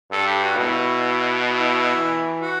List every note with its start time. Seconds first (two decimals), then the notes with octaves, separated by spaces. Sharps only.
0.12 G2 A4
0.27 G4
0.43 F#4
0.58 B2 E4
1.50 E4
1.97 E3
2.42 F#4